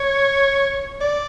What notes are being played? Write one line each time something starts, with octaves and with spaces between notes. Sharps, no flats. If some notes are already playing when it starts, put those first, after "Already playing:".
Already playing: C#5
D5